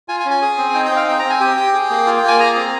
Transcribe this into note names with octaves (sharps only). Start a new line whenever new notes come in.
F4 G#5
G#5
C#4
G#5
G#4
C4
D#4 G5
G5
C4
F5
C4 G5
A#5
C4
G#5
G4 G5
G4
G#4
A#3
F4
G5
A#3
G#5
G#4 A#5
C4